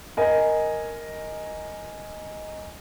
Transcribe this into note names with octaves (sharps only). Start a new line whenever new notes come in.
A#4 D#5 G#5